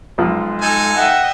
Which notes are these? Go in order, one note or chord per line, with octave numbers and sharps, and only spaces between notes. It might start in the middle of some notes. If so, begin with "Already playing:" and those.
B1 F3 G#3 F4
D#4 A4 G#5
D#5 E5 F#5 G5